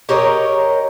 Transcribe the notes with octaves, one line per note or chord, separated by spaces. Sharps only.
G4 A#4 C#5 D#5